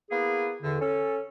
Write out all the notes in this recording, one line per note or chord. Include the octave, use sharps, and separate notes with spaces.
A#3 B3 E4 G#4
E2 D3
C#4 A4